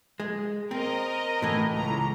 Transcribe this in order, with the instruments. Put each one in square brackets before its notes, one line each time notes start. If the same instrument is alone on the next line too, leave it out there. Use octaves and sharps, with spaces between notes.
[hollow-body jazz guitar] G#3
[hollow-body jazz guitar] C4 [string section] A#4 D#5
[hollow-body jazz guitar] A2 E3
[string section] C#2 A#5